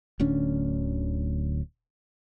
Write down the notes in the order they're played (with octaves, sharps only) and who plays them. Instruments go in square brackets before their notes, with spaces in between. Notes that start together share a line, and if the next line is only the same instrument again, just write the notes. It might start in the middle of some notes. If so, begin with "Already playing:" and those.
[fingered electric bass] D1 D2 C#4 D4